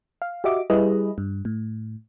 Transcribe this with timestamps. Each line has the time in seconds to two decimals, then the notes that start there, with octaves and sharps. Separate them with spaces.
0.22 F5
0.44 F#4 G4 D#5 E5 D6
0.70 G3 E4 G#4 B4 D#5
1.18 G2
1.45 A2